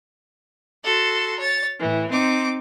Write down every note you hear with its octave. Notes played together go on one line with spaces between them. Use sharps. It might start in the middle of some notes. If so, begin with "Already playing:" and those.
F#4 A4 C6
C#5 A6
A2 E3
C4 D#4 D6